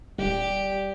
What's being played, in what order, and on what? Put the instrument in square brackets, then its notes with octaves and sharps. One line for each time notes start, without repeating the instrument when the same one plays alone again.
[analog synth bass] D#1 [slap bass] G3 [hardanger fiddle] G4